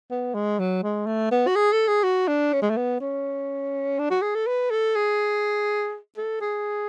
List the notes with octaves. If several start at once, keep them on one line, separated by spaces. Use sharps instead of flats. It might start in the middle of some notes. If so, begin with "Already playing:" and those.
B3
G#3
F#3
G#3
A3
B3
F#4
G#4
A4
G#4
F#4
D4
C#4
G#3
A3
B3
C#4
D4
F#4
G#4
A4
B4
A4
G#4
A4
G#4